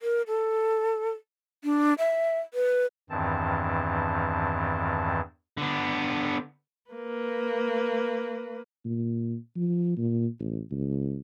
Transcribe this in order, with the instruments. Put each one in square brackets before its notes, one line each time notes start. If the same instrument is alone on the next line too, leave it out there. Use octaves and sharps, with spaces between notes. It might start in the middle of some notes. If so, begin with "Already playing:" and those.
[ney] A#4
A4
D4
E5
B4
[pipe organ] E2 G2 D#3 E3 C4 A5
[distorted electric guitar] D3 B3
[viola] A#3 B4
[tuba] A#2
F3
A#2
A1
C#2